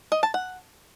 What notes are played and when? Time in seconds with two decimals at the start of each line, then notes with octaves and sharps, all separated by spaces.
0.12 D#5
0.23 A5
0.34 F#5